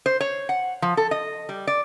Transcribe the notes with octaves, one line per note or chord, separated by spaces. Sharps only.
C5
C#5
F#5
F3
A4
D#5
G3
D5